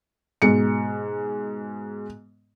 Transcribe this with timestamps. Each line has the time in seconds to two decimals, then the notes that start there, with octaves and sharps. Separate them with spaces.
0.42 G#2 B2 C#7